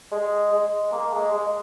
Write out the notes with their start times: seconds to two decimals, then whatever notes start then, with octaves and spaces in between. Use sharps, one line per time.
0.12 G#3
0.52 G#3
0.92 A#3
1.13 G#3
1.32 G#3